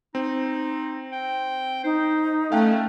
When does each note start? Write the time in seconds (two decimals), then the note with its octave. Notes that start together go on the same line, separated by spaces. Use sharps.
0.15 C4 D#4
1.13 G5
1.84 D#4 C5
2.52 A3 C#4 F5 G5 F#6